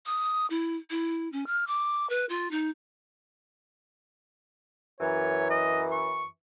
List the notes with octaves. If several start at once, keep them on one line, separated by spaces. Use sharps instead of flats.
D#6
E4
E4
C#4
F6
D6
B4
F4
D#4
F#2 E3 C#5
D#5
C#6